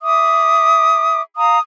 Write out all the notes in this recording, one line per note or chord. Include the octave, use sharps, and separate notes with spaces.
E5 D6 D#6
F5 A#5 D#6